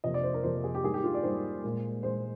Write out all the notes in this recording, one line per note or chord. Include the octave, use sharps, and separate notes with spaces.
F2 C3 F3 A#3 D#5
D5
C5
A#4
F2 C3 F3 A#3 C5
G#4
G4
G#2 G3 A#3 G#4
G4
F4
D5
G#2 G3 A#3 C5
A#2 G#3
A#2 G#3 C5